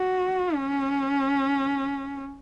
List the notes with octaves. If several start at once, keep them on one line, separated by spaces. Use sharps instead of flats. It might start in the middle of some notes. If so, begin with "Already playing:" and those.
Already playing: F#4
C#4